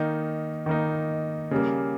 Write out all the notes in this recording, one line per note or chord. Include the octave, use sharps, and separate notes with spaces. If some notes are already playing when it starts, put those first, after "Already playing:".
Already playing: D#3 A#3 D#4
D#3 A#3 D#4
C#3 G3 A#3